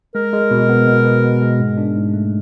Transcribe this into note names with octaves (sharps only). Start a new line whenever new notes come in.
G#3 A#4
G#3
B2
B3
B2
B3
B2
G#3
G#2
D4
G#2
A3